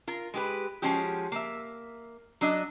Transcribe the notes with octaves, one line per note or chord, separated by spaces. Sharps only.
F4 A#4
G#3 G4 B4
F3 G#3 C#4 F#4 G4
A#3 E5
F#3 D4 D#5